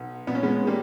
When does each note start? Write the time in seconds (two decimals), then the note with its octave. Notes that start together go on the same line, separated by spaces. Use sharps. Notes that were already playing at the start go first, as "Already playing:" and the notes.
Already playing: B1
0.27 A#2 B3
0.35 C#4
0.43 G#3 B3
0.67 G3 A#3